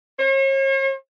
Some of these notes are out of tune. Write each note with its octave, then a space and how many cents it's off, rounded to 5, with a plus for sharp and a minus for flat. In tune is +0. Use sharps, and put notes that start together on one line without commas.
C#5 -45